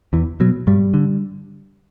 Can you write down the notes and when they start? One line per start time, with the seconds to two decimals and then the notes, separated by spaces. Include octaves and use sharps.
0.13 E2 E3
0.40 B2 F#3
0.67 G2 G3
0.94 D3